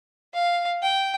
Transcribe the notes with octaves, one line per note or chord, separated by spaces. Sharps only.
F5
G5